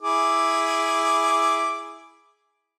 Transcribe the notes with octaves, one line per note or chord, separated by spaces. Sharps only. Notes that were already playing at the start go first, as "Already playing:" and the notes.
E4 G#4 D6